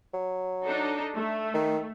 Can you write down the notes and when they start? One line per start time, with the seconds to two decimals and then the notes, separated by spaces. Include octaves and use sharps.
0.14 F#3
0.65 D4 D#4 A4
1.15 A3
1.54 D#3